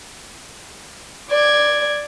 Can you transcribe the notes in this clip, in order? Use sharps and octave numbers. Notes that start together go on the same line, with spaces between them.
D5 G#6